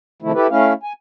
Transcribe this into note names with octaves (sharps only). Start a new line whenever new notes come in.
C3 D#3 F3 A3 E4
E4 G4 A4 B4
A3 C#4 E4 F5
G#5